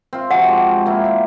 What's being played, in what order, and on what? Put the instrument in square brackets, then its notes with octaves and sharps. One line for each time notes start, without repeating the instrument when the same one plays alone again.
[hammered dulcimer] C4 F4
[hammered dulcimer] C3 F3 F#4 [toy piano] F#5
[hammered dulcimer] G#3 D6
A#3 E4
C4